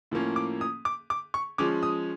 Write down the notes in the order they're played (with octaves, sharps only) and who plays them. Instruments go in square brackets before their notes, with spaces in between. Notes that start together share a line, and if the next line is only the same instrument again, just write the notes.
[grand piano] A2 F3 A#3 C#4
D6
D#6
D6
D6
C#6
F3 G#3 C#4 D6
D#6